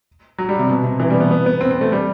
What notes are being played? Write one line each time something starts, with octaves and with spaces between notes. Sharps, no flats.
F#3
G3
C3
B2
C3
E3
G3
B3
B3
B3
C4
C4
A3
G3